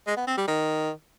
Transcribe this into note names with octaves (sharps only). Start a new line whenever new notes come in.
G#3
B3
C4
G3
D#3